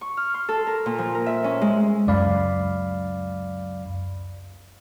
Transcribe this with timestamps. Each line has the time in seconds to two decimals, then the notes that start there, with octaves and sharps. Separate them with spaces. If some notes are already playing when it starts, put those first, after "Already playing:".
0.01 C#6
0.17 F6
0.34 C6
0.49 A4
0.67 A#4
0.86 A#2
0.98 F3
1.15 A#4
1.26 E5
1.44 C#4
1.61 G#3
2.07 C#2 F#2 D5 F5 B5